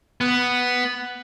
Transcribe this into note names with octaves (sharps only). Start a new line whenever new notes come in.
B3